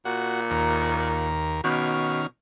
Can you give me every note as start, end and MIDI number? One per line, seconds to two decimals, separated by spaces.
0.05 1.31 46
0.05 0.40 66
0.05 0.40 78
0.50 1.61 39
0.50 1.61 70
1.64 2.23 47
1.64 2.27 51
1.64 2.27 61
1.64 2.27 89